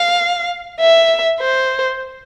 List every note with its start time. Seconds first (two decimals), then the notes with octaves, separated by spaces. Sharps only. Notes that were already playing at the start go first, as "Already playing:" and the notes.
Already playing: F5
0.80 E5
1.40 C5